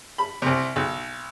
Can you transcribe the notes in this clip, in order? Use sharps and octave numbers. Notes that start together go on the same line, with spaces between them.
B5
C2 C3
B1